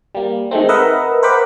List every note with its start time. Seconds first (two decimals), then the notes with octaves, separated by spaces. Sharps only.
0.15 G3 A#3
0.51 D#3 G#3 A3 C4
0.69 A#4 B4 D#5 E5 F#5
1.23 A#4 C5 F#5 G5 B5 D6